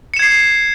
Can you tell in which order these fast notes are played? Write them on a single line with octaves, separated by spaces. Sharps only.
C#7 E7 G#6 C7